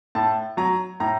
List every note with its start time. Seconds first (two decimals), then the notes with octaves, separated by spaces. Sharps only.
0.15 A2 A5
0.57 F#3 A#5
1.00 A2 A#5